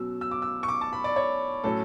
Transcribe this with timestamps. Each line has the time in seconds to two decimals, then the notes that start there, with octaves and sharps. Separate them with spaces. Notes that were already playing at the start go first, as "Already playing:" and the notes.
Already playing: B2 F#3 C#4 E6
0.21 E6
0.31 D6
0.42 E6
0.63 C#6
0.68 D6
0.81 A5
0.93 B5
1.04 D5
1.16 C#5
1.64 A2 F#3 C#4 A4